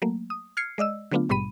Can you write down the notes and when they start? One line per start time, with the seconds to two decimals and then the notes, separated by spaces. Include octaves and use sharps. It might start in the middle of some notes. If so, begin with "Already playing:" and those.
0.02 F#3 A3 A#3
0.30 D#6
0.57 F6 G#6 C7 C#7
0.78 G#3 D5 D#5 E6
1.11 D3 F#3 A3 B3 D4 F4
1.29 A#1 G#2 B2 G3 B5 D#7